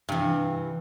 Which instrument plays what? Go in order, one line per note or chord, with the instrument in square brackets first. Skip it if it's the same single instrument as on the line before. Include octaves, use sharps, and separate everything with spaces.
[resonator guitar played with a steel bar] G2 [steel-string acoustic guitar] C3 E3